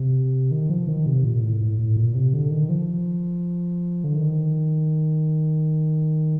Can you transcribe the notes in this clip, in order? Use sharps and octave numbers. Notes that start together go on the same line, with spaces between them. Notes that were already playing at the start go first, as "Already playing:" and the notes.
Already playing: C3
D#3
F3
D#3
C3
A#2
A2
A2
A2
A#2
C3
D3
D#3
F3
D3
D#3